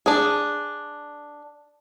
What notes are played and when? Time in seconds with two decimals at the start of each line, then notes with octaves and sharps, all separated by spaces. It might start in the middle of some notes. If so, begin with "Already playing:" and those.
0.06 D4 G#4